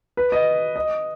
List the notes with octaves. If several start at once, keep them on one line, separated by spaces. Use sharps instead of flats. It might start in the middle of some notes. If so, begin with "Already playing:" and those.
B4
D#5
D#5